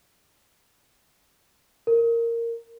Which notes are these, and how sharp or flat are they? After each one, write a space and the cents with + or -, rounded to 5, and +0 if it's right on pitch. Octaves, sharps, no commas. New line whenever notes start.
A#4 -10